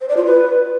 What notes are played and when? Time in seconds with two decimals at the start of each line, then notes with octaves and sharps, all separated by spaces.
0.01 C5
0.09 D5
0.17 F4
0.25 B4